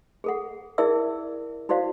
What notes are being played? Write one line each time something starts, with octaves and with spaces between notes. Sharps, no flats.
G#4 A4 F#5
E4 G#4 A#4 D5 E5 E6
E4 F#4 C5 D5 F5